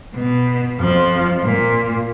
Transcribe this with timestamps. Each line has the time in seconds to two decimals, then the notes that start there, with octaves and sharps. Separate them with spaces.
0.15 B2
0.79 F2 F3
1.43 A#2